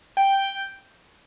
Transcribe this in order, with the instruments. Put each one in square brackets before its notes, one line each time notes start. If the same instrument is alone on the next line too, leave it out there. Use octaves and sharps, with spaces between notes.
[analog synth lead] G5